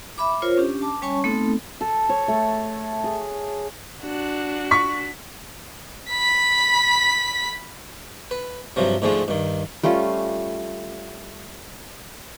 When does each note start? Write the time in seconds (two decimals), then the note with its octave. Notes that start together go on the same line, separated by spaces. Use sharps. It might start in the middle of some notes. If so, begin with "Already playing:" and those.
0.18 E5 B5 D6
0.42 F4 A#4 C5 C#5
0.57 C#4 D4 G4
0.82 A5 D6
1.02 G3 C#4 C#5 G#5 A5 C#6
1.24 A3 B3 C4 D#4 A4
1.81 A4
2.09 C#5
2.28 A3
3.04 G#4
4.02 D4 F#4
4.71 C#6 B6
6.10 B5 B6
8.31 B4
8.76 G2 C3 F3 F#3
9.02 G#2 D3 F3 G#3 A3
9.28 G2 D#3
9.83 G3 A3 C#4 F4